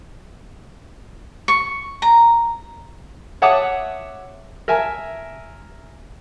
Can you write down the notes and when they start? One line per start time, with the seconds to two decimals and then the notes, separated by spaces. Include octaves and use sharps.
1.48 C#6
2.02 A#5
3.42 C#5 E5 F#5 A5 D6 D#6
4.68 A#4 E5 G#5 A5